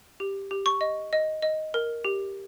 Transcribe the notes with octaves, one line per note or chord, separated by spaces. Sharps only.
G4
G4
C#6
D#5
D#5
D#5
A#4
G4